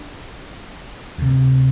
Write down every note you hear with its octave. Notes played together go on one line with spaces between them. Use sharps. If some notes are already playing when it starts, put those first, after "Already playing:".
Already playing: D4
D2 C3